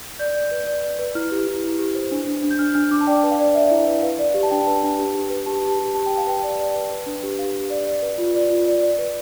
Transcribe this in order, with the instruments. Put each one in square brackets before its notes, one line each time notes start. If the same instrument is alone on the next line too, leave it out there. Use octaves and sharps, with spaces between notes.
[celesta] D5 G6
D5
B4
D5
D5
B4
E4 F6
G4
E4
E4
G4
C5
D4
D4
D4
G6
D4 F6
D4 F6
D4 D6
A5
D5 G5
B4
F5
D5
D5 E5
E4
B4
B4 F5
D5
G4
A5
D4 G5
B4
D4
G4
G4
B4
G4 A5
G4
G4
G4 A5
G4 G5
F5
B4 G5
D5
D5
B4
B4
D4
G4
G4 F5
G4
D5
D5
B4
F4
D5
F4
D5
D5
B4